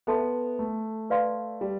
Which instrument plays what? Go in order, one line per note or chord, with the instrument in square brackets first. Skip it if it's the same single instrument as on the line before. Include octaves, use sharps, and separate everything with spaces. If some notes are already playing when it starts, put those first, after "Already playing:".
[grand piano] B3 [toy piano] A4 E5 A5 C6
[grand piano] A3
[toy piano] B4 D5 F5 C6
[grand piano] G3